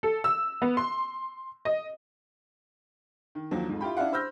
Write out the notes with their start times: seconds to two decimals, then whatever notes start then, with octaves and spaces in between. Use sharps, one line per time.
0.03 A4
0.24 E6
0.62 B3
0.77 C6
1.65 D#5
3.35 D#3
3.51 D#2 D3 F3 F#3
3.69 F2 G#2
3.81 E4 F4 G4 G5 B5
3.97 C#4 D4 E4 F5 F#5
4.12 C5 B5 E6 F6 G6 A#6